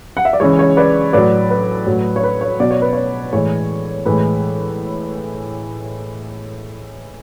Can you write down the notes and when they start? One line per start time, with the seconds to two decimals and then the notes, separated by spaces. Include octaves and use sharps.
0.17 F#5
0.25 E5
0.33 D5
0.40 C#3 E3 G#3 C#5
0.59 C#5
0.77 B4 D5
1.13 A2 F#3 B4 D5
1.50 B4
1.87 A2 F#3
2.16 C#5
2.23 B4
2.41 C#5
2.60 B2 F#3 D5
2.71 C#5
2.82 B4
2.93 C#5
3.33 A2 E3 G#3 C#5
4.05 A2 E3 G#3 B4